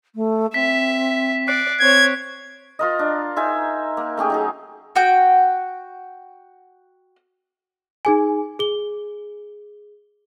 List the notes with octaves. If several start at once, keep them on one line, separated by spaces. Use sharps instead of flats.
A3
C4 E5 B6
D5 F#6 C7 D7
C4 C#5 G#6
F4 A#4 D#5
D4
D#4 C5 E5 G#5
A#3
A3 C#4 G4 G#4
F#3 D#4 G#4
F#4 G5
D#4 G#4 G#5
G#4 G7